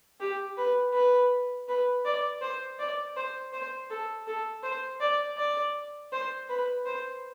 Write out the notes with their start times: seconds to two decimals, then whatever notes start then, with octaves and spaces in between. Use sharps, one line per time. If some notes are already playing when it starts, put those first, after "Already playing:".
0.20 G4
0.57 B4
0.93 B4
1.69 B4
2.05 D5
2.42 C5
2.79 D5
3.16 C5
3.53 C5
3.90 A4
4.27 A4
4.63 C5
5.01 D5
5.37 D5
6.13 C5
6.49 B4
6.86 C5